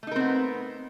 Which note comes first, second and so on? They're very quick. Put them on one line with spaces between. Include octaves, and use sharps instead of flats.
A3 D#4 A#4 C4 B3